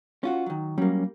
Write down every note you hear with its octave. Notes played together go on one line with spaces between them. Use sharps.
C#4 F4 F#4
D#3 F#3
F#3 G3 A#3 C#4